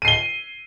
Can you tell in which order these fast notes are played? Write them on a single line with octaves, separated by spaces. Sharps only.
D#7 C7 G7